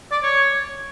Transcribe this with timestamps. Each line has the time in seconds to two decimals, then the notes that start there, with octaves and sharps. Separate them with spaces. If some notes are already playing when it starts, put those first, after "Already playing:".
0.12 D5
0.23 C#5